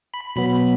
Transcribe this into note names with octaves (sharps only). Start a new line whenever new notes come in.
B5
B2 F#3 B3 B5